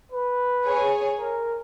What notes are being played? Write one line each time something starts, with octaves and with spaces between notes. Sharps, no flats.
B4
G#4 C#5 G#5
A#4